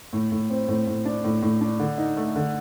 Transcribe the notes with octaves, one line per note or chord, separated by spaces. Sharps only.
A2
A2
C4
A2
A2
D4
A2
A2
D4
D3
D#4
A3
D3